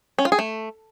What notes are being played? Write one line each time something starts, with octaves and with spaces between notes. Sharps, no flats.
C#4
F4
G#4
A3